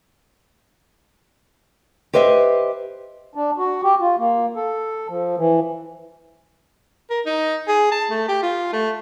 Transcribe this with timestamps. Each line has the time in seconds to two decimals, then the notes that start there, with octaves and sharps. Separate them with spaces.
2.14 G4 B4 C5 D#5 E5
3.35 D4
3.58 F#4
3.84 G4
4.01 F4
4.18 A#3
4.56 A4
5.09 F3
5.37 E3
7.10 A#4
7.25 D#4
7.68 G#4
7.91 A5
8.10 A3
8.28 G4
8.43 F4
8.73 A3